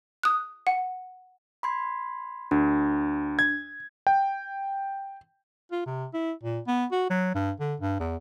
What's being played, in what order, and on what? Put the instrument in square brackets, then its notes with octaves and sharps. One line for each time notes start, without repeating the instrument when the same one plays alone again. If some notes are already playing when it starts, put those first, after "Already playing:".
[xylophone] D#6 F#6
F#5
[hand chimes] B5 C6 G#6
[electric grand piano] D2 [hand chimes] D4
[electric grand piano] G#6
G5
[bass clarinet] F4
C3
E4
A#2
B3
F#4
F#3
G2
D3
G2
E2